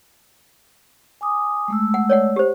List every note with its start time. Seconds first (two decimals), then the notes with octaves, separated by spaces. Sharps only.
1.21 G#5 D6 D#6
1.68 G#3 A3 E6
1.94 F#5
2.10 C#5 D5 F#5
2.36 G4 C5